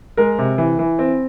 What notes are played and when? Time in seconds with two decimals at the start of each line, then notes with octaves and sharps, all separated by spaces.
0.17 G#3 A#4
0.38 C3
0.58 E3
0.79 E3
0.99 C4